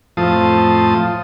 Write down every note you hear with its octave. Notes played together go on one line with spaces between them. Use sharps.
F2 A2 F3 C5 A5 D#6